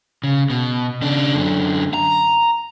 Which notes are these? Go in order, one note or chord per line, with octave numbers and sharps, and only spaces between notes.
C#3
B2
C#3 D4
F#2 D3
A#5